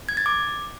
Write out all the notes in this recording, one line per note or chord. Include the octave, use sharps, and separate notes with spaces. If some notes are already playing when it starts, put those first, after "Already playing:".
G#6
A6
D6